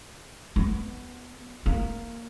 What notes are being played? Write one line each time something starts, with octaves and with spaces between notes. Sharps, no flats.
B3
A#3